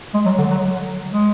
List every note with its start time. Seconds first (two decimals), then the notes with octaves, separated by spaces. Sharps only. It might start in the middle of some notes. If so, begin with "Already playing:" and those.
0.14 G#3
0.26 F#3
0.38 D3
0.51 F#3
1.12 G#3